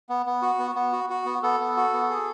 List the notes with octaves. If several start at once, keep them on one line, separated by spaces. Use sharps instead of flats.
B3
B3
F#4
B3
B3
F#4
F#4
B3
B3 A4
B3
F#4
B3
G#4